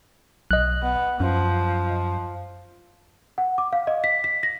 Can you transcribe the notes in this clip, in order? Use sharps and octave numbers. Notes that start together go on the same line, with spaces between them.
B1 D#5 F#6
B3
F#2 F3
F#5
D6
F5
D#5
B6
B6
A#6